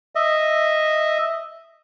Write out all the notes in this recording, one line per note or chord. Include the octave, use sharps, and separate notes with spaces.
D#5 E5